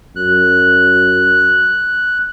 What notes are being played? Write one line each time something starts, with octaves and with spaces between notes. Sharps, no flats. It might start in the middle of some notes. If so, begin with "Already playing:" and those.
F#2 F#6